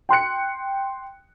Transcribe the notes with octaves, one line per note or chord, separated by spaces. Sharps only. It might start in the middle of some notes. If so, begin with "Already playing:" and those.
G5 C6 F#6 C#7